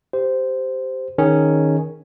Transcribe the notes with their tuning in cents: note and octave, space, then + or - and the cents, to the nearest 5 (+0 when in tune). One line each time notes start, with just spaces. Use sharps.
G4 +0 C5 -10
D#3 +0 C#4 +0 G#4 +0